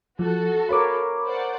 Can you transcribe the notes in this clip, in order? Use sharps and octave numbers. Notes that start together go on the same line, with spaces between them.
F3 F#4 A4
A#4 C#5 F5 B5 D6
C5 D5 F#5